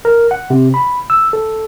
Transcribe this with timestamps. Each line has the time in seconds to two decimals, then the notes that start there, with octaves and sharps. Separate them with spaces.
0.05 A#4
0.31 F#5
0.50 C3
0.74 B5
1.10 E6
1.33 A4